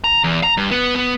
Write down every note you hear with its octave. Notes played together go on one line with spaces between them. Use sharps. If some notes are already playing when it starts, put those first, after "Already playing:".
A#5
E2
A#5
G2
B3
B3